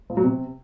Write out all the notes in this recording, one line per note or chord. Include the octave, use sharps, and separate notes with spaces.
F3
F#3
C3